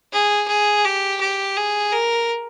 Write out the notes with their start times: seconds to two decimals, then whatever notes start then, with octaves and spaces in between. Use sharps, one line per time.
0.13 G#4
0.48 G#4
0.85 G4
1.20 G4
1.57 G#4
1.92 A#4